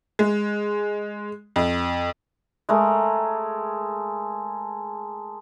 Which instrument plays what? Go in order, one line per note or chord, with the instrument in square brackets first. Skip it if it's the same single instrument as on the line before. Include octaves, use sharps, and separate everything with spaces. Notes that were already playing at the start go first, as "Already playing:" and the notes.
[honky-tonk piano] G#3
F2
[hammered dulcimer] G#3 A3 A#4